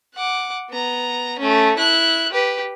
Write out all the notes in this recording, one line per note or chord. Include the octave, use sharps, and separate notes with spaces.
F#5 D6
B3 A#5
A3 C#4
E4 F#6
G4 B4